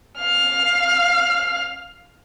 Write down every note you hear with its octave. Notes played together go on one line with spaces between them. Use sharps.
F5 F6